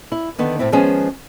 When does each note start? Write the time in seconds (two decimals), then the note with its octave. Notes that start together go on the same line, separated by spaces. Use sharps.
0.12 E4
0.38 D3 D#3 B3
0.59 A2 C4 E4
0.72 D#3 F3 G#3 B3 C#4 G#4